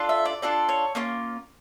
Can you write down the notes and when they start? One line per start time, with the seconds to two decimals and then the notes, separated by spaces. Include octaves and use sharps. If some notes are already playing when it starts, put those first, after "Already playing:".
Already playing: D4 F4 A4
0.09 E5
0.25 D5
0.42 D4 F4 A4 D5
0.69 C#5
0.95 A#3 C#4 F4